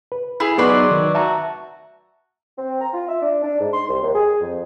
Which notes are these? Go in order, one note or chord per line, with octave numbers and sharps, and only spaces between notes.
B4
E4 G#4
F#3 B3 D#4 G#4 B4 D5 C6
D#3
F#4 E5 A5 A#5
C4
A#5
F4
E5
D4
D4
G#2
C6
C2
D#2
G#4
F2